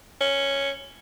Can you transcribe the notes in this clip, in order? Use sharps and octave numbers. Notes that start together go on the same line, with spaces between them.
C#4